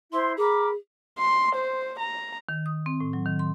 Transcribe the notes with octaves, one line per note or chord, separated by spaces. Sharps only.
E4 C5 C6
G#4 A#4 B5 D6
C6
C5
A#5
D#3
D#6
C4
A2
F#3
D#3
C6